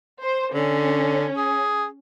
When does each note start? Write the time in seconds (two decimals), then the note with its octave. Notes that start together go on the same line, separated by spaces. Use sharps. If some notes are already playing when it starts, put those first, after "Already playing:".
0.23 C5
0.54 D3 C#4
1.37 G#4